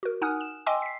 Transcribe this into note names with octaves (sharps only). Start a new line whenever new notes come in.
F#4 A#4
D#4 F#5 G#5 D#6 F6 F#6
E7
D#5 G5 G#5 C6 D6 E6
B6 C7